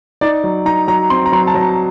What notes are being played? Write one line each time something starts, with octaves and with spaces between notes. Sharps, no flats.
D#4 D5
F#3
D#4 A#5
F#3 A#5
C4 C6
A#5
F#3 C6
A5
F#3 A#5